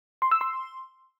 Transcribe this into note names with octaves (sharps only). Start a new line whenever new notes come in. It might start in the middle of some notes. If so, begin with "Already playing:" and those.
C6
E6
C6